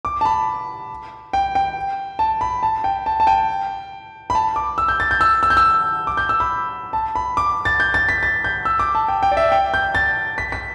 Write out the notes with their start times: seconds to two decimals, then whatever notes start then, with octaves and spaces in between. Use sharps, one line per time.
0.05 D6
0.21 A5
0.25 B5
1.33 G5
1.55 G5
2.19 A5
2.41 B5
2.63 A5
2.84 G5
3.06 A5
3.20 A5
3.27 G5
4.30 B5
4.35 A5
4.56 D6
4.78 E6
4.88 G6
5.00 A6
5.11 G6
5.21 E6
5.43 E6
5.50 G6
5.57 E6
6.07 D6
6.17 G6
6.29 E6
6.40 B5
6.93 A5
7.16 B5
7.37 D6
7.65 A6
7.80 G6
7.94 A6
8.09 B6
8.23 A6
8.44 G6
8.65 E6
8.79 D6
8.95 A5
9.08 G5
9.23 G5
9.31 D5
9.37 E5
9.52 G5
9.74 G6
9.95 A6
10.38 B6
10.52 B6